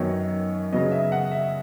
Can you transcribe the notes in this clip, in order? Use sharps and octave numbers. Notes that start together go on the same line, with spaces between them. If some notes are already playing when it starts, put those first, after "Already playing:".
Already playing: F#2 D#3 F#3 B3 C#5
C#3 F#3 B3 D#5
E5
F#5
E5